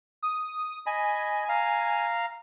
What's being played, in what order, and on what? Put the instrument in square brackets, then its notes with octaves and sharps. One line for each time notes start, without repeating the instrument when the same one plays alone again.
[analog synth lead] D#6
[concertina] D#5 B5 [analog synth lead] G#5
[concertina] F5 A#5